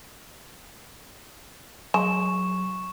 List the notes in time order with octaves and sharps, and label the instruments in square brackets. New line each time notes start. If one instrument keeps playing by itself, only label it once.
[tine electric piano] F#3 [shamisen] G#3 [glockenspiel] C#6 E7